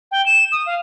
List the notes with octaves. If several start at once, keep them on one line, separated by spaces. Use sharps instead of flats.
G5
E7
D#6
F5